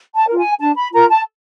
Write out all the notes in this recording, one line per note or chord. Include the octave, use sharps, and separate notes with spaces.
A5
F4 A#4
G#5
D4 A5
B5
F4 A#4 A#5
A5